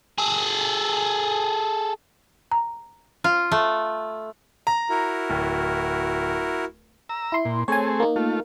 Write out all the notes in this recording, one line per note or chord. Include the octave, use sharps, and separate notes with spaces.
G#4 A4
A#5
F4
A3
A#5
E4 F#4 A#4
D1
A#5 E6
E4 C6
A#2
A3 C4 G#4 C#5 G#5
A#3 D#4
A3 F4